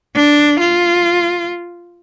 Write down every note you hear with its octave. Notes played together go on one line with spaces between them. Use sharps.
D4
F4